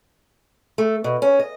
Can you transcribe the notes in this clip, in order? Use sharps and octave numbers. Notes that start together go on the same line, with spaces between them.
A3
B2
C#4
D#5